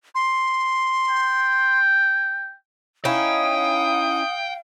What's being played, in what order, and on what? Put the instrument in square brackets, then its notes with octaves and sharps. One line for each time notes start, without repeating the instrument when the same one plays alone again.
[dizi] C6
[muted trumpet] G5
[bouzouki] C#4 D#4 E4 [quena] F5 [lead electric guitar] G5 [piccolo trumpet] D#6